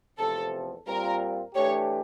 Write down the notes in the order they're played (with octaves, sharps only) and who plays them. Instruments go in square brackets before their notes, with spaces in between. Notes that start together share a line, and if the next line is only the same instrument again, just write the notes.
[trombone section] E2 C3 F3 A3 C4 [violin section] A4
[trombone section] A#2 G3 C4 F4 [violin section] A#4
[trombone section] E3 A3 D4 G4 [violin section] C#5